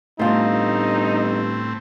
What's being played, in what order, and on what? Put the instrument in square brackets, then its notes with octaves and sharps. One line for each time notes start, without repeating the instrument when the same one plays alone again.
[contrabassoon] G1 [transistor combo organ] A2 C4 [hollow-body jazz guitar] A3 F4 [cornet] D#4